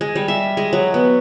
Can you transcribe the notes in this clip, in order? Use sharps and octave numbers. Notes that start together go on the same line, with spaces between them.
G#3
G3
E5
G#3
F#3
B3